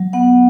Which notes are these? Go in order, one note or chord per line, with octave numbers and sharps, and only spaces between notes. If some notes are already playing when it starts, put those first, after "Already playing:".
Already playing: F#3
B3 F#5